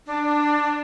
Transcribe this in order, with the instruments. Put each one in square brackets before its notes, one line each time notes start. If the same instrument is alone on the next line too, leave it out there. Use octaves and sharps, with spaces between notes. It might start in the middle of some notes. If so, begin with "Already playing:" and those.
[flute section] D4